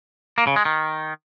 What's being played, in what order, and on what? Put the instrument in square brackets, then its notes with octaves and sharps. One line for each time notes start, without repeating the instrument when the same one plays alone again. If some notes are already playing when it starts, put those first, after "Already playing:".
[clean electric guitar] A#3
C#3
G#3
D#3